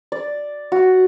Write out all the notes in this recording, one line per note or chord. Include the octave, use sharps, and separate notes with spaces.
D5
F#4